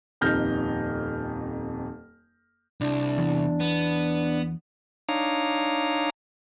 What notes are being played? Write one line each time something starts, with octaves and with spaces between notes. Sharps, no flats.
D#1 F2 D#4 F6 G6 A#6
C2 D4
E2
B3
D4 D#4 C#5 F5 A#5